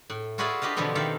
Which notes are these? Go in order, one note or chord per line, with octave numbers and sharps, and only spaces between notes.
A2
F4 F#4 G#4 B4 D5 E5
D4 G4 B4 D#5 F5
B2 D3 E3 F3 B3 C4
D#3 A4 D5 E5 F5